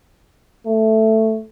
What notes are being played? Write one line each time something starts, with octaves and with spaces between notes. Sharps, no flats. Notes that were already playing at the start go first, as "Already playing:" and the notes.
A3